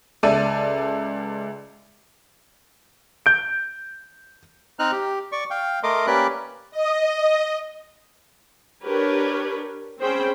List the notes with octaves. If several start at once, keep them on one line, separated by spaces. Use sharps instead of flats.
C#2 A4 D5 E5 D#7
G6 D7
C4 D#4 F6 F#6
G4
D5 C#6
F5 G5
A3 A#4 D#5 C6 D6
A#3 C#4 G4 B4 D5 F#6
D#5
D4 G4 A#4 B4 C#5
C4 C#4 G#4 C5 G5 B5